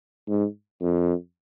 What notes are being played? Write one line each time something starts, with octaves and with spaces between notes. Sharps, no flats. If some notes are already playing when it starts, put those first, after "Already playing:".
G#2
F2